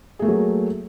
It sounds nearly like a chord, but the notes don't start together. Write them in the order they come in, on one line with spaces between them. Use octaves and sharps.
G#4 A3 A#3 F#3